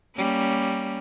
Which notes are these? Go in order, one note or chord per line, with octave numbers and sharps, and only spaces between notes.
G3 A#3 C#4